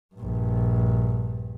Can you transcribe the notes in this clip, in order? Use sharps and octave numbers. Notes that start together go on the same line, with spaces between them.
A#1 G2